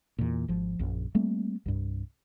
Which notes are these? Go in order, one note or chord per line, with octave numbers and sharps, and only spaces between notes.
E2 A#2
G#1 F3
A#1 F#2
G3 A3 A#3 C4
C2 G2